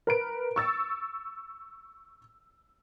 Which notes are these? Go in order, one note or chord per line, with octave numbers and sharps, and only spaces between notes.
A#4 B4 D7
C#6 E6 A6